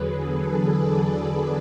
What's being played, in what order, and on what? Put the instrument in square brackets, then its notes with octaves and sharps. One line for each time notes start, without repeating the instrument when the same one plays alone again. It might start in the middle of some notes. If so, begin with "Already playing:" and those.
Already playing: [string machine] E2 D3 F#3 G#4 B4
A4
D5
D5